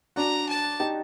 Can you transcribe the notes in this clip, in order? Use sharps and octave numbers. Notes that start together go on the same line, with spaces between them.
D4 F#4 A#5
A5
D#4 G4